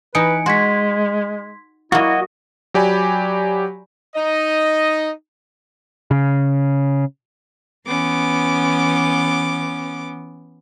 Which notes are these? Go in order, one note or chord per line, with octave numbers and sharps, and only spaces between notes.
E3 D#4 B4 G#5 C#7 D7
G#3 F#4 C6 G#6 B6
F#3 A#3 E4 F#4 D#5
F#3 G4 D5 G#5 B5
D#4 D#5
C#3
E3 B3 C#4 D6